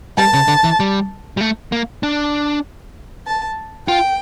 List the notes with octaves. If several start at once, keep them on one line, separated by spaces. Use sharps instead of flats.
G3 A5
C#3
D3
E3
G3
G3
A3
A#3
D4
A5
F4 G5